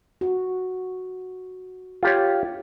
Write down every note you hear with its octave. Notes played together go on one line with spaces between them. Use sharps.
F#4
F4 G4 C#5